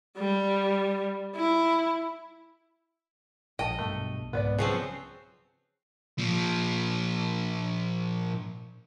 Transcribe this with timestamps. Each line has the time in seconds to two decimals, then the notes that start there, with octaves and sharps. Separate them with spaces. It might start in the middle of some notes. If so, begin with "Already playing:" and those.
0.17 G3
1.36 E4
3.59 A#1 D#5 G5 A5
3.79 B1 G2 B2 A3
4.33 C2 G#2 B2 B3 C#5 D5
4.58 C#3 F3 F#3 B3 C4
6.18 A#2 F3